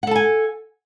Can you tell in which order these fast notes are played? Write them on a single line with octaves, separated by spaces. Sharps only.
F#5 A4 A5 G#5